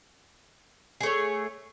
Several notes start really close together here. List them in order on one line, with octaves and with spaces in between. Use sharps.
G#4 A3 C#5